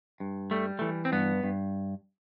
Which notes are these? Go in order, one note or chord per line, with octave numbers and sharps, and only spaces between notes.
G2
G3 A3
E3 A3
C4
G2 B3
G2